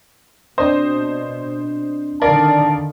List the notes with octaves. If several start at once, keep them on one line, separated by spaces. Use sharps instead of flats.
B2 C4 D4 C5 D#5
D3 D#3 A#4 D5 F5 A5